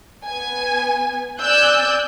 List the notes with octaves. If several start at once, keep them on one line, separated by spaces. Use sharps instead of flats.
B3 G#5
D5 G#5 E6 F#6 G6